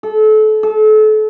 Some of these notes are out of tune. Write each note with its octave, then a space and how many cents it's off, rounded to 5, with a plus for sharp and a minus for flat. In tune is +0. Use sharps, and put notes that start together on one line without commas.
A4 -30
A4 -35